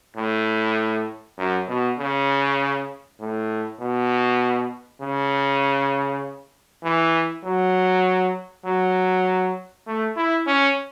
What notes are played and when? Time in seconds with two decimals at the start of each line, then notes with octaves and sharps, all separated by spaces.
0.16 A2
1.38 F#2
1.68 B2
1.98 C#3
3.20 A2
3.80 B2
5.01 C#3
6.83 E3
7.44 F#3
8.65 F#3
9.87 A3
10.17 E4
10.47 C#4